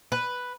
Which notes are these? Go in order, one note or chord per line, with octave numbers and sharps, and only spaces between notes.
B4